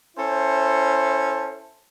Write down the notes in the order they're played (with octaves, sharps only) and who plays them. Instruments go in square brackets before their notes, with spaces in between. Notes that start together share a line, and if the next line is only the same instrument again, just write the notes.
[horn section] C#4 E4 A4 C5